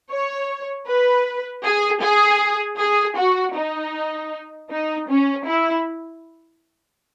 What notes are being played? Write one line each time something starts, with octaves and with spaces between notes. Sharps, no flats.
C#5
B4
G#4
G#4
G#4
F#4
D#4
D#4
C#4
E4